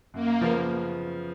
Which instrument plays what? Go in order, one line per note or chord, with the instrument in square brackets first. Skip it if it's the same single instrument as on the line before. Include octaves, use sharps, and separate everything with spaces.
[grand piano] F#2 [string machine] A#3
[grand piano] C#3 F3 B3